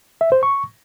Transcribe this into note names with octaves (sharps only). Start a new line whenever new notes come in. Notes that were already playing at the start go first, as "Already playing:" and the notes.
E5
C5
C#6